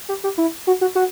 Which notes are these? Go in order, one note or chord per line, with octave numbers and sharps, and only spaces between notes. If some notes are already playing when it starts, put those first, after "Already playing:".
G4
G4
E4
F#4
F#4
F#4